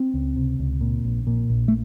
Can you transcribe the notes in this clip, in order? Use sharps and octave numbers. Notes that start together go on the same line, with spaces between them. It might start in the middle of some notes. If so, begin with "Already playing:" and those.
Already playing: C4
C#2
C3
C#2
A#2
A#1
A#2
A#1
A3